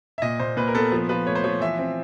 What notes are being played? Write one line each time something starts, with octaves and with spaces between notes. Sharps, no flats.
E5
A#2 D#5
A#2 C5
A#2 B4
A#4
B3 A4
F3
F3 B4
A3 C#5
C5
F3 C#5
E3 E5
C4